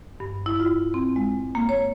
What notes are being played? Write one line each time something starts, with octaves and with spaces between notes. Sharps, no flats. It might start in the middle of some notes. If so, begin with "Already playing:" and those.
G2
E4
F4
C4
G#3
A#3
C#5